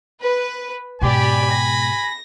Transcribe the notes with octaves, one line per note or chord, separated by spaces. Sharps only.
B4
G#2 B2 G4 D5 G#5 B5
A#6